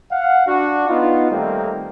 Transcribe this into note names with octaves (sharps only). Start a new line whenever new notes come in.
F5 F#5
D4 F#4
B3 D#4 F4
D#3 G3 A3 A#3 C4